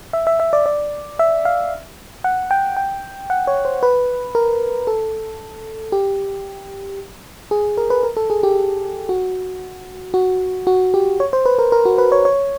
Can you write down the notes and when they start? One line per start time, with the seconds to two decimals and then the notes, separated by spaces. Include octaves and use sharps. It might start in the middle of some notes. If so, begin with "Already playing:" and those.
0.13 E5
0.27 E5
0.40 E5
0.53 D5
0.66 D5
1.19 E5
1.45 F5
2.24 F#5
2.51 G5
2.77 G5
3.30 F#5
3.47 C#5
3.65 C5
3.83 B4
4.35 A#4
4.87 A4
5.92 G4
7.51 G#4
7.77 A#4
7.90 B4
8.03 A#4
8.17 A4
8.30 G#4
8.43 G4
9.09 F#4
10.14 F#4
10.67 F#4
10.94 G4
11.20 C#5
11.33 C5
11.46 B4
11.59 A#4
11.72 A#4
11.85 F#4
11.98 B4
12.12 C#5
12.25 C#5